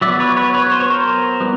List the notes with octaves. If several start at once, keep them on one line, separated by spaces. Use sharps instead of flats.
F#3 B3 D5 E5
B4 C#5
B4 C#5
B4 C#5
C5
C#5
A#4 C5
E3 G3 B3